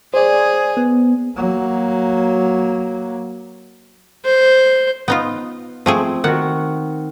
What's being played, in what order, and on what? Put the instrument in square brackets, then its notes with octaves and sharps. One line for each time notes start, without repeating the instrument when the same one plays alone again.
[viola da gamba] G#4 [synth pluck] C5 D5
[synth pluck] B3
[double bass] F#3 A#3
[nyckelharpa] C5
[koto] B3 D#4 F4
[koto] F3 A3 G#4 [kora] C4
[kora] D#3 F#4 [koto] F#5